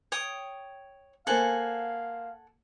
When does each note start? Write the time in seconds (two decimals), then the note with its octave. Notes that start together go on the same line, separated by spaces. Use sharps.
0.12 C#5 G5 D#6
1.27 A#3 A4 C5 F5 F#5 G#5